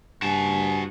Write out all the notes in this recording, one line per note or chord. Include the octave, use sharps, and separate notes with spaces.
G2 F#4 G#5 A5